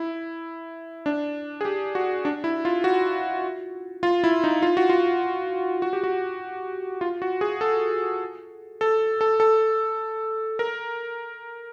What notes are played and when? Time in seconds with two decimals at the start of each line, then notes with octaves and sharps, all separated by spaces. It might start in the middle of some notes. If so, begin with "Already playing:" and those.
Already playing: E4
1.06 D4
1.61 G#4
1.65 G4
1.95 F#4
2.25 D4
2.44 E4
2.65 F4
2.84 F#4
4.03 F4
4.24 E4
4.44 D#4
4.63 F4
4.77 F#4
4.89 F4
5.82 F#4
5.93 G4
6.04 F#4
7.01 F4
7.22 F#4
7.41 G#4
7.61 A4
8.81 A4
9.21 A4
9.40 A4
10.59 A#4